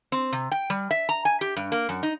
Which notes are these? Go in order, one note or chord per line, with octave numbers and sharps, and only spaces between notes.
C4
C3
G5
G3
E5
A#5
G#5
G4
G2
A#3
F#2
D#4